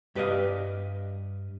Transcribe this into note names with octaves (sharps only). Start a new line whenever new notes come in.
G2 G4 B4 D5 D#5 F5